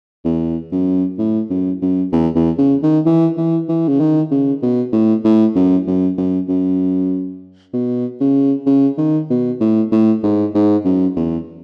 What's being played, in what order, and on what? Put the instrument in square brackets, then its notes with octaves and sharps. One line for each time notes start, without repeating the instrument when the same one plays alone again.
[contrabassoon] E2
F#2
A2
F#2
F#2
E2
E2
C#3
D#3
E3
E3
E3
C#3
D#3
C#3
B2
A2
A2
F#2
F#2
F#2
F#2
B2
C#3
C#3
D#3
B2
A2
A2
G#2
G#2
F#2
E2